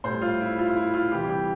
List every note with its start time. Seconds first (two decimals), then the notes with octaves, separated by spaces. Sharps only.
0.04 A2 G3 C5
0.22 F4
0.41 E4
0.58 F4
0.69 F4
0.76 E4
0.94 F4
1.12 C3 E3 G3 G4
1.30 G4